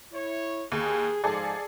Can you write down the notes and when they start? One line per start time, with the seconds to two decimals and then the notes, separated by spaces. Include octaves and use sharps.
0.13 E4 C#5
0.72 D#2 G#4
1.24 G#2 F3 G#4 A4 D5